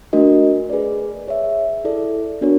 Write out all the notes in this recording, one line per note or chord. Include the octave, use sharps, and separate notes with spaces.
A3 D4 F#4 A#4 D#5
G#4 B4 D5
G#4 C#5 E5
E4 A4 D5
B3 D4 F#4 A#4 C#5